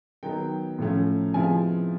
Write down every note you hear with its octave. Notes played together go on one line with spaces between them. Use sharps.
D#3 F#3 B3 G5
A2 F3 A3 C#4
C3 F3 G#3 B3 E4 G#5